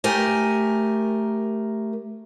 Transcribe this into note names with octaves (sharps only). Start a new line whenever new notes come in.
A3 G4 A#4 G#5